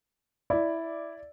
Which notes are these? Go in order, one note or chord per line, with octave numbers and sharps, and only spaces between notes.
E4 D5